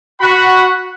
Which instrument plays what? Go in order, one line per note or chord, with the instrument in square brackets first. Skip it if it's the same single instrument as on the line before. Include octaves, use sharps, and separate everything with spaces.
[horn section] F#4 F#5 B5